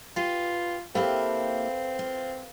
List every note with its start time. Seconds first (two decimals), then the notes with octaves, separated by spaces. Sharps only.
0.16 F4 G4 B4
0.95 A#3 C4 E4 G4 A4 B4 F5
1.99 F4